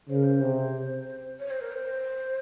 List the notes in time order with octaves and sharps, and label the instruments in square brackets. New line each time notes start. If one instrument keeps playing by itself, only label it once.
[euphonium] C#3 [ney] C5
[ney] A#4
C5
[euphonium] C3
[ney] C#5
C5
A#4
C5